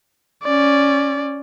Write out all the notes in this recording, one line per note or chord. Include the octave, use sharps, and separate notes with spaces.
C#4 D5